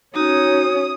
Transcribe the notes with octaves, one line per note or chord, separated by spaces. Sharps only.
C#4 D#4 F#4 C#5 D#6